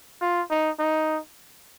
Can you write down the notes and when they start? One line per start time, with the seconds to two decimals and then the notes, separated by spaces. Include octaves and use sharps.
0.21 F4
0.50 D#4
0.79 D#4